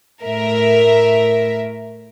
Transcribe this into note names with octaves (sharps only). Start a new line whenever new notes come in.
A2 A#4 E5